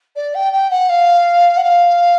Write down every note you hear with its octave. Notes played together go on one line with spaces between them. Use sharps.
D5
G5
G5
F#5
F5
F#5
F5